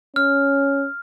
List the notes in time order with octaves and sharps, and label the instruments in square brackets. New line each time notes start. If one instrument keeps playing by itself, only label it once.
[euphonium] C#4 [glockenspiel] F6